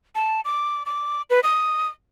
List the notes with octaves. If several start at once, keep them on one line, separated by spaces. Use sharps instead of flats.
A5
D6
D6
B4
D#6